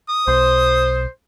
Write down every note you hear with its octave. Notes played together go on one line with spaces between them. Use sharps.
D#6
B1 C5